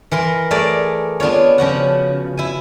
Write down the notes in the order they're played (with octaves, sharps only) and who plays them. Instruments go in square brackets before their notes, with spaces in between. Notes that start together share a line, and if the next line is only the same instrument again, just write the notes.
[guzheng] E3 A#4 C6
A3 G#4 A#4 D5
B3 D4 F4 C#5
C#3 F3 F#4 F#5
E4 G#5